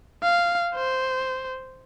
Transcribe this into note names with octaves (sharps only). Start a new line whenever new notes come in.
F5
C5